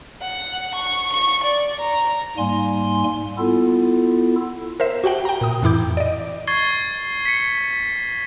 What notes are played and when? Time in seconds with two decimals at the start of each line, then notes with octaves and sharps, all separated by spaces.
0.22 F#5
0.75 C#6
1.13 C#6
1.44 D5
1.81 A#5
2.37 G#2 G3 A#3 G#5 C6
3.38 B3 E4 F4 A4
4.80 A#4 C5 E5
5.04 F#4 G4 F#5 G5
5.25 G5 A#5
5.41 A#2 D#6
5.62 F2 A2 E3 E4 D6 G6
5.97 D5 D#5
6.47 C#6 G#6 A6 C7 G7
7.26 B6 C#7